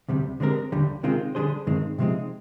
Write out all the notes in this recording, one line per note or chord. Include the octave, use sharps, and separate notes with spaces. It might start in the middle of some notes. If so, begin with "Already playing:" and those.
D2 C3 G3
D3 G#3 C4 G4 A#4
D#2 D3 G3
C3 D#3 G#3 C4 F4
D3 G3 D4 G#4 C5
G2 D#3 G#3 C4
C3 F3 G#3 C4 D#4